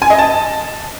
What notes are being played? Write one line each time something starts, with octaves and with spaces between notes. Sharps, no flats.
G#5
D#5
A5